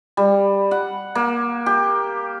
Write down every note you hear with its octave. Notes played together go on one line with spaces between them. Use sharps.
G3
F#5
A#3
G4